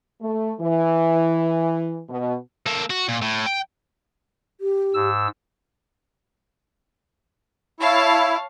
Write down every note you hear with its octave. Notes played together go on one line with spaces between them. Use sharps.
A3
E3
B2
A#3 A4
F#4
A#2
A2
G5
G4
G#2 E6
E4 C#5 F5 A5